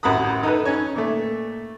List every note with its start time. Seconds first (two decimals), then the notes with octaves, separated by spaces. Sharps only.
0.03 A1 F#2 F#5 B5 D#6
0.43 D#4 A4 B4
0.65 C#4 D#4 C#5
0.96 A#2 A3